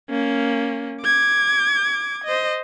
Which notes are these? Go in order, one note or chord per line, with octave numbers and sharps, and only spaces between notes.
A#3 C#4
D6 G#6
C5 D#5